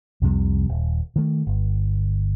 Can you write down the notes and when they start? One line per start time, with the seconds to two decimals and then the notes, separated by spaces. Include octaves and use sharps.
0.22 C2 F2 C3 G3
0.69 D#1
1.16 D#3 A3
1.47 G1